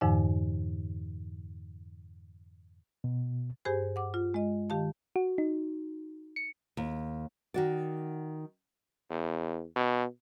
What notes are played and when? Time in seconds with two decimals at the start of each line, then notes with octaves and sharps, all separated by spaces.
0.01 F2 G#2 D3 E3 G#5
3.04 B2
3.65 G2 G4 G#4 C5 G#5
3.96 F#5 D6
4.14 F4
4.34 G#3 D#5
4.70 D#3 G4 F5 A5
5.16 F#4
5.38 D#4
6.36 C#7
6.77 D#2
7.54 D#3 F#4 D5
9.10 E2
9.76 B2